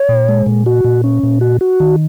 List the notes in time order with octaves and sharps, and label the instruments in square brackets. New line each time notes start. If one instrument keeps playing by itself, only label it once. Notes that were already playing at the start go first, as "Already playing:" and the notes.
Already playing: [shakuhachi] C#5
[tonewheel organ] A#2
G#3
A#2
F#4
A#2
C#4
A#2
F#4
F#4
D#3